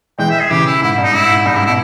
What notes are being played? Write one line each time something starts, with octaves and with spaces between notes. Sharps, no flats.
E3 G#3 G5
E5
G#4
C#3 E3 G4
E4
G#2 E4
G2
D#4
G#2 E4
G#2
G2 D#4
G#2 E4
B2 E4